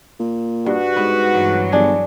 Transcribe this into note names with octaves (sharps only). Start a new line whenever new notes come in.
A#2
G2 F#4 B4
G#2 B3
G2 E3 F#3
G1 D4 G#4